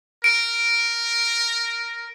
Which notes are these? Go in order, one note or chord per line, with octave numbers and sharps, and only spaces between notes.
A#4 D7